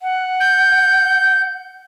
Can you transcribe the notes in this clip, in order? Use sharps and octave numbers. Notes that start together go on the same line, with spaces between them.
F#5
G6